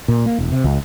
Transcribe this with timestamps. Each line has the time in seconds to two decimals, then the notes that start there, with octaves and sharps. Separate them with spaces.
0.08 A#2
0.26 A#3
0.38 E1
0.52 C3
0.64 C#2